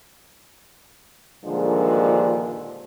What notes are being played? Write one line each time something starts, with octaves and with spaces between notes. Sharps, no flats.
G2 A#2 D3 D#3 F3 G#3